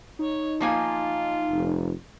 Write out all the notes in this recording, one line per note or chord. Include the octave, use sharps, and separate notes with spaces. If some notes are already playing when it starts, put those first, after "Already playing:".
D#4 C#5
F3 A#3 F4 G#5
F1